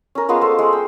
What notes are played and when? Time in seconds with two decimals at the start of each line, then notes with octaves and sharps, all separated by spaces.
0.15 C#4 A#4
0.29 G#3 A#3 B3 F4
0.41 A4 C5
0.59 G#3
0.73 G5